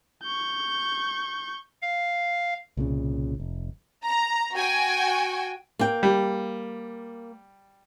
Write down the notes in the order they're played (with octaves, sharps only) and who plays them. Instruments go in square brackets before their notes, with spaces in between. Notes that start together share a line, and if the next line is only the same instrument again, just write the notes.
[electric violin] C#6 G6
[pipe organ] F5
[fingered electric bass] C2 A#2 C#3
F1
[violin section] A#5
F#4 G5 G#5
[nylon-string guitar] A#3 G5
[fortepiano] G3